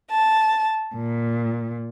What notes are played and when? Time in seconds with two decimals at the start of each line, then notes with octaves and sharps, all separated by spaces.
0.10 A5
0.95 A#2